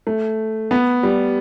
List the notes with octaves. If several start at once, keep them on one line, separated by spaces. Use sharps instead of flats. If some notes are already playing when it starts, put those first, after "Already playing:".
A3
B3
G3